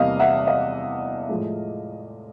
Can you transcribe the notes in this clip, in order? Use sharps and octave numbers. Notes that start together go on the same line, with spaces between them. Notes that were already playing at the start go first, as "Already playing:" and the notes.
Already playing: E2 C3 E3 G3 A#3 D#5 F5
E5 F#5
D#5 F5
A2 F3 G#3